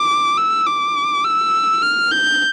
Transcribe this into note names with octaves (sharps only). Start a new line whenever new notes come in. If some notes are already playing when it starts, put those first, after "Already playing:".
Already playing: D6
E6
D6
E6
F6
G6